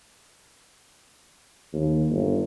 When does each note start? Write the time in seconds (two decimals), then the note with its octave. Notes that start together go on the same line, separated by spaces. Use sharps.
1.73 D#2
2.11 G1